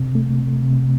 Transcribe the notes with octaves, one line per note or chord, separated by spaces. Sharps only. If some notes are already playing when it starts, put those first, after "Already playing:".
Already playing: C3
A3
C3